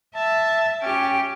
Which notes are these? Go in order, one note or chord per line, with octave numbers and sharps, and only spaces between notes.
E5 A5
C#4 G4